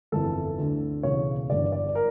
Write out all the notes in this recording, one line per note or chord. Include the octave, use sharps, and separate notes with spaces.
G1 F2 E3 A4
D2 D3
E1 E2 C#3 E3 C#5
G1 G2 E3 D5
D5
A#4